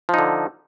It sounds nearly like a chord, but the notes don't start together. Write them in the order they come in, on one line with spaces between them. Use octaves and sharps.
F3 D#4 D3